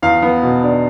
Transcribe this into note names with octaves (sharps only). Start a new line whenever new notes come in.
E2 F5
B3
B2
D4